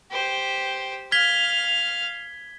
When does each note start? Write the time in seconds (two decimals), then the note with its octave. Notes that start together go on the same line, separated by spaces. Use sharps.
0.11 G4 C5
1.12 F5 F6 G#6 B6 G7